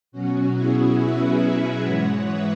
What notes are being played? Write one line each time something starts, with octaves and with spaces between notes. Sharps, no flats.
B2 F#3 C#4 F#4
E4 G#4
B4 E5
E5 G#5
G#2 E3 G#3 C#5 F#5
B4 E5